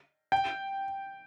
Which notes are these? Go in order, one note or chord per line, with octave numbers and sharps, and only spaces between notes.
G5